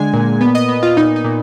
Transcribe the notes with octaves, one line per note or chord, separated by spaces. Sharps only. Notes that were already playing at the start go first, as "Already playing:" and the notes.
Already playing: D3 G#3 G#5
A#2
B3
D#5
B3
F4
A#2 D#4
D#4
A#2